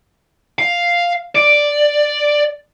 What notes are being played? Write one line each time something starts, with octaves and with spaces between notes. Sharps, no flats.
F5
D5